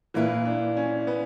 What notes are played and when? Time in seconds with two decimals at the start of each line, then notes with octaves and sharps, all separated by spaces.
0.14 A#2 E3 A#3 E4 B4
0.45 D4
0.77 C#4
1.07 B3